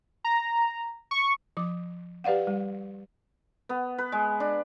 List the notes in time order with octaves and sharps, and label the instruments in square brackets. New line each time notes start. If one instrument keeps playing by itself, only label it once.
[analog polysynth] A#5
C#6
[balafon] F3 D6
G4 B4 D5 F5 F#5
G3
[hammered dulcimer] B3
B4
G#3
D4